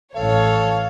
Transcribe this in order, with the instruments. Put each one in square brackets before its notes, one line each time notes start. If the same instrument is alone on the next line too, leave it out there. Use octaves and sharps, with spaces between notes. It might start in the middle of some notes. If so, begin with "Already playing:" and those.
[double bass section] A1 A2 E3 [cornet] A4 [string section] C#5 [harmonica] F5